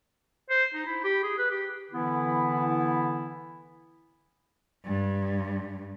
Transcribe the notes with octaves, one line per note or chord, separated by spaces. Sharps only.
C5
D#4
E4
G4
G#4
B4
G4
D3 E3 B3 E4
G2